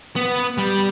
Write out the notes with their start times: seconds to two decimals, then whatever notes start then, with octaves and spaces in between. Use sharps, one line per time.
0.16 B3
0.58 G3